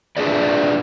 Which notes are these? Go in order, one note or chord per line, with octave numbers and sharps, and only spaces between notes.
D4 F4 G#4 B4 D5